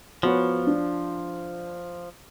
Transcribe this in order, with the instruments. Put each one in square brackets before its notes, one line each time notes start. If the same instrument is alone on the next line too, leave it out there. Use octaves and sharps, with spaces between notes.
[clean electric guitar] F3 [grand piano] B3 F#4 C#5
[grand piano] D4